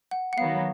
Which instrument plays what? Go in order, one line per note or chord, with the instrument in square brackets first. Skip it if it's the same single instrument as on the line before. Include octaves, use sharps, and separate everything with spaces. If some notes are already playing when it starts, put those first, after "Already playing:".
[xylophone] F#5
F#5
[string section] D#3 F#3 B3 [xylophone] F5